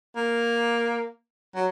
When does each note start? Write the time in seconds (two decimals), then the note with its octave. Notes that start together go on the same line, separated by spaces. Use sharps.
0.16 A#3
1.55 F#3